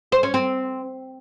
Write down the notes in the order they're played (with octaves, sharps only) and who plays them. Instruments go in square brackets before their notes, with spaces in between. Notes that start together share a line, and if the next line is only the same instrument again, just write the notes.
[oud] C5
C#4
C4